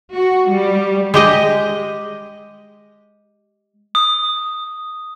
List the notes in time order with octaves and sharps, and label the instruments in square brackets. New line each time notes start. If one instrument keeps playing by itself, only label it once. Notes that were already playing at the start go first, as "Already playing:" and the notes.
[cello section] F#4
G3
[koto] G#3 G4 D#5
[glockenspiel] D#6